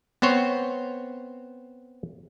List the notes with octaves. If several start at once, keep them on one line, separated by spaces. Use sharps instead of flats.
B3 C4 C5 C#5